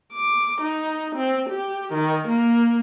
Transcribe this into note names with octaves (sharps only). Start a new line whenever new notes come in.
D6
D#4
C4
G4
D#3
A#3